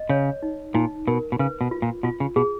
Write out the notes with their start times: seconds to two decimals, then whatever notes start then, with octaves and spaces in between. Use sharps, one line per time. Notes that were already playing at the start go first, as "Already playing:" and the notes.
Already playing: D#5
0.09 C#3 C#5
0.43 D#4
0.74 A#2 D#4
1.07 B2 A#4
1.32 B2
1.39 C#3 B4
1.61 B2
1.71 F4
1.82 A#2
2.03 B2 F4
2.20 C#3
2.36 B2 G#4